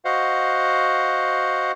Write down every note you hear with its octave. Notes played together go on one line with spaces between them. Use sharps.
F#4 C5 D#5 F5 F#5